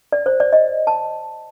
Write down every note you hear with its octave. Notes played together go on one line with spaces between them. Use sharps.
D5
C5
D5
D#5
A5